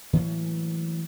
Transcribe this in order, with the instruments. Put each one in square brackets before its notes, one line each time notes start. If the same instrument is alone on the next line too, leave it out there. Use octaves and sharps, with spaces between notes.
[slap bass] A2 E3 F#3 A#3